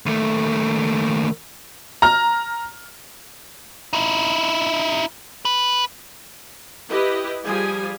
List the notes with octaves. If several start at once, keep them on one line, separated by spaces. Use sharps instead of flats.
D#2 A3
A#5 F6
D#4 E4
B4
E4 G4 B4 D#5
F3 G3 G#4 G#5